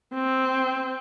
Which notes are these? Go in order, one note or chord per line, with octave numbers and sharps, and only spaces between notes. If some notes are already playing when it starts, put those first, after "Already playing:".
C4